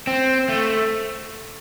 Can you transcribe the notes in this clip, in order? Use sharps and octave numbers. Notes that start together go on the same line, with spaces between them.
C4
A3